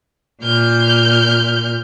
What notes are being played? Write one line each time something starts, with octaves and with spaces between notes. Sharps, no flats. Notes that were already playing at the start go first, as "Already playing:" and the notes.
A#2 F6 G6